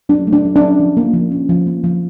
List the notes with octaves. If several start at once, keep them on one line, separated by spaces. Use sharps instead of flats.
F#3 D4
A3
D4
F#3
D4
C#4
F3
A#3
F3
C#4
F3
A#3
F3